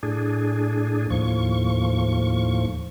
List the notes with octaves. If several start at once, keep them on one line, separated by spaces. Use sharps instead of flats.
A2 D4 G#4
D#2 A2 F3 C#6